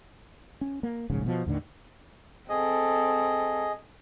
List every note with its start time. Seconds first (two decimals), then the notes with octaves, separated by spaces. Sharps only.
0.61 C#4
0.83 A#3
1.10 D#1 A#1 G#2 C#3
1.26 B2 F3
1.46 D#2 A2 D3 D#3
2.49 C4 G#4 A4 D#5